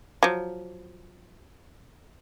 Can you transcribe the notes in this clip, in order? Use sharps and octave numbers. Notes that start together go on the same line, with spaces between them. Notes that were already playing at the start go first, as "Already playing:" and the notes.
F3 F#3